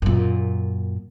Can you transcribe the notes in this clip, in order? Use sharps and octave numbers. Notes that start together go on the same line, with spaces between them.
F#2 A#2